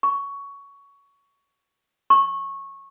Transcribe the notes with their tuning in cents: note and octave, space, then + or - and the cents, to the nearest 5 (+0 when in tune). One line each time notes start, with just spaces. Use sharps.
C#6 +15
C#6 -15